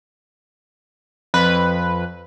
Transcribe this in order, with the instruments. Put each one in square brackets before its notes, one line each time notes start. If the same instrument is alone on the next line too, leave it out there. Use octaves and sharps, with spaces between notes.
[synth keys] F2 B4